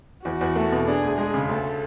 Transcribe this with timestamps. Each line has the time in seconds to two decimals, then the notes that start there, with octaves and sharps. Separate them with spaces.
0.24 E2 F#4
0.41 E2
0.56 A3
0.72 B2
0.87 D4 G#4
1.03 D2
1.17 G#3 G#4
1.34 C#3
1.49 D2 A4